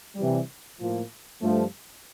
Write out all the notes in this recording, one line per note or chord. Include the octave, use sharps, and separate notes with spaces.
C3 E3 G3
A2 F3 A#3 F4
G2 F3 A3